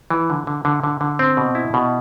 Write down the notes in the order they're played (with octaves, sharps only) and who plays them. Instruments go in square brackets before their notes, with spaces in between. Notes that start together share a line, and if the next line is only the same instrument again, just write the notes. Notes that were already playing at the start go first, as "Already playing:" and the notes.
[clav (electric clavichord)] E3
D3
D3
D3
D3
D3
C4
B2
E4
B2